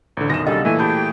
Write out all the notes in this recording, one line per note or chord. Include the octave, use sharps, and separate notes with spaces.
A1 D3
B1 F#2 D#3 D#5 A#6 E7
C#3 G3 B3 D4 A4 D#5
A#2 E3 A3 A4 E5 G#5
G4 G#4 G5 A5 B5 G6